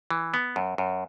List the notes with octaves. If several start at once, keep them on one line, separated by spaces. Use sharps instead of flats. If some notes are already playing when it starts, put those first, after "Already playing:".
E3
B3
F#2
F#2